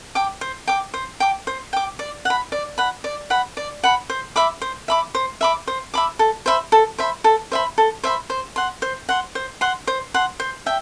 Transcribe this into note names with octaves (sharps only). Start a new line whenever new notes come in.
G5 D6
C5
G5 D6
C5
G5 D6
C5
G5 D6
D5
F#5 B5
D5
F#5 B5
D5
F#5 B5
D5
F#5 B5
C5
E5 B5 D6
C5
E5 B5 D6
C5
E5 B5 D6
C5
E5 B5 D6
A4
C5 E5 B5
A4
C5 E5 B5
A4
C5 E5 B5
A4
C5 E5 B5
C5
F#5 C6
C5
F#5 C6
C5
F#5 C6
C5
F#5 C6
C5
E5 G5